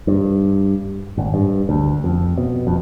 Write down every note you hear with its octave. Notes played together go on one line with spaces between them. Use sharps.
G2
G#1
G2
D2
F2
B2
F2